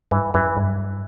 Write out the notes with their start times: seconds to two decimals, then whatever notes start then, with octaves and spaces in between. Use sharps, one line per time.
0.11 G2 E3
0.34 F#2 E3
0.57 G2